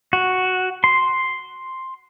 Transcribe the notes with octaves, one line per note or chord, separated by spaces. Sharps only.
F#4
C6